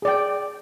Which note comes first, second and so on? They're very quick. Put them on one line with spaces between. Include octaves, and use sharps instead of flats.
G#4 D5 G5